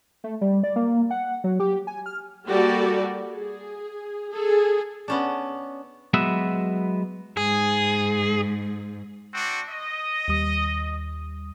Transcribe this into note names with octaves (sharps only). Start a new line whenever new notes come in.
A3
G3
D5
A#3
F#5
F#3
G4
G#5
F6
G3 A#3 F#4 G4 A4 D5
G#4
G#4 A4
B3 C#4 D4
F#3 G#3 B3 F#4 B4 E5
G#2 G#4
C4 D4 F#4
D#5
D#2 G3 D#6